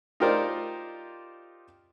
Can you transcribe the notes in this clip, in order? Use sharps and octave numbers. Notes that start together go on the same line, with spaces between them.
D#4 F4 G4 A#4 C5 D5